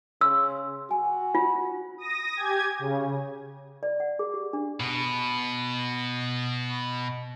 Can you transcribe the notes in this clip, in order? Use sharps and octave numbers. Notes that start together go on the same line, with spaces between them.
C#3 C6 E6
F#4 G#5
F4
D#6 A#6
G4 G#5 G#6
C#3
D5
F#5
G#4
G4
D4
B2 B3